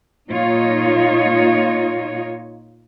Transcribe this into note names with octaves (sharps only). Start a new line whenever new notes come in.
A#2 D#4 F4 C#5 D#5